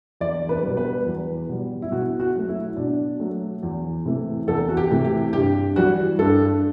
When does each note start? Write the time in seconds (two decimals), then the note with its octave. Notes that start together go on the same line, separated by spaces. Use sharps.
0.21 E2 D5
0.49 B4
0.63 B2 G3
0.77 B4
1.06 E2
1.49 B2 G3
1.82 E4
1.92 B2 F#4
2.20 F#4
2.35 F#3 A3
2.48 E4
2.76 B2 D4
3.20 F#3 A3
3.63 E2
4.05 C3 E3 A3
4.48 E2 A4
4.69 F#4
4.77 G4
4.91 C3 E3 A3
5.05 G4
5.33 G2 G4
5.76 E3 G3 F#4
6.19 G2 A4